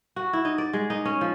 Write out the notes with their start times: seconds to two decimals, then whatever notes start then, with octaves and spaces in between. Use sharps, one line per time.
0.16 F#4
0.33 E4
0.45 D#4
0.58 D5
0.73 G#3
0.90 D#4
1.05 C#4
1.21 F3